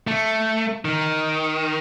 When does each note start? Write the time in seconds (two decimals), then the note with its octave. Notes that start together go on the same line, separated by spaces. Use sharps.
0.07 A3
0.85 D#3